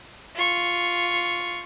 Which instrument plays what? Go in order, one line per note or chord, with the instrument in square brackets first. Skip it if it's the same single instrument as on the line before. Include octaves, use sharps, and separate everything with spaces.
[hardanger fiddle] F4 C#6